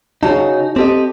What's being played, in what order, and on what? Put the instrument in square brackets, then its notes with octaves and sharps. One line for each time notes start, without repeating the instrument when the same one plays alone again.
[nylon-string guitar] C#3 F#4 A5 [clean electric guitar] D#4
[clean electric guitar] C4 A4 D#5 [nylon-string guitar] G4